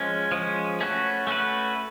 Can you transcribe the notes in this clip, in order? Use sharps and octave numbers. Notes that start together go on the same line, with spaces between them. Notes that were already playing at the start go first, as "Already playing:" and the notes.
Already playing: F3 G#3 C#4
F3 G#3 C#4
A3 C#4 F#4 B4
A3 C#4 F#4 B4